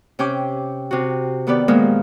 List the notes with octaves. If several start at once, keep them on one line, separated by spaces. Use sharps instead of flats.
C3 C#4 G5 D6
C3 F#4
D#3 B3 G4 B4 D5
A#2 D#3 F3 G#3 A#3 B3